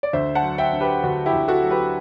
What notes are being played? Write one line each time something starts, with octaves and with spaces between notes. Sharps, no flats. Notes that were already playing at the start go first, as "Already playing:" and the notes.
D5
D2 C5 E5
F#5 A5
F#3
E5 G5
D3
G4 B4
D2 F#4
E4 G4
D2
F#4 A4
F#3
G4 B4